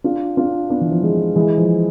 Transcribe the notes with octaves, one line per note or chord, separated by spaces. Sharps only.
D4 F4
D4 F4
B3 D4
E3
F3
E3 G#3
E3 G#3
F3